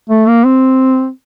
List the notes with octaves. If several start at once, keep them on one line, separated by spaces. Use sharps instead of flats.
A3
A#3
C4